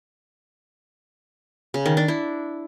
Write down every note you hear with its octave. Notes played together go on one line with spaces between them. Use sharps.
C#3
D#3
D4
E4